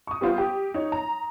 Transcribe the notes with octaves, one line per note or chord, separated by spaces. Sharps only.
C#6 D#6
G3 B3 F4 C5
G4
D#4 C#5
A#5